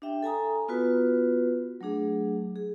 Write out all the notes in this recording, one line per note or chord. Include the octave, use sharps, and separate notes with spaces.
D4 G4 E5 G5
A4 G#5 A#5 D#6
B3 F4 F#4 B4
F#3 A3 D4 G#4
G#4